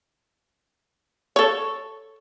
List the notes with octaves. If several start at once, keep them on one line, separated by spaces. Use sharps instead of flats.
A4 C#5